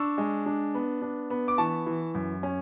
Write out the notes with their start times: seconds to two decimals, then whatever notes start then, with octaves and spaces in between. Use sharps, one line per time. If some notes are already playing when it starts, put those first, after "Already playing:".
Already playing: D4 C#6 E6
0.18 G#3
0.46 D4
0.74 B3
1.02 D4
1.30 B3
1.48 D6
1.58 E3 A5 C#6
1.86 E3
2.15 F#2
2.43 C#4